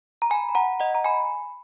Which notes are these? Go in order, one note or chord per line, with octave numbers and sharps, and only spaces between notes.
A#5
G#5 B5
B5
F#5 A#5
D#5 F#5
A#5
G#5 B5